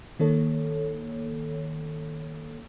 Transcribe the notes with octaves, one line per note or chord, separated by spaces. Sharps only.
D#3 A#3 A4 C#5